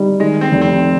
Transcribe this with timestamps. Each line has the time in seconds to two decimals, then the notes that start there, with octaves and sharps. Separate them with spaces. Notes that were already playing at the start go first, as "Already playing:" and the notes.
Already playing: G3 D#4
0.20 D#3 G#3
0.41 C4
0.52 F1
0.61 C4